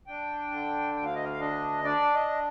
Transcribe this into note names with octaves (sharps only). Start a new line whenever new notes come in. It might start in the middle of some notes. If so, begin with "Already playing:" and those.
D4 G5
D3
D2 G5
F5
D#5
F5
D4 D#5
D4 D5
D#5